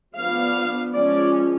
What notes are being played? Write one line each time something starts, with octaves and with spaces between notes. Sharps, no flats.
F3 B3 D4 F5
F3 G#3 C#4 D5